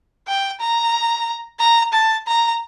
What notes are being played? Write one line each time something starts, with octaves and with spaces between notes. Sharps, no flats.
G5
A#5
A#5
A5
A#5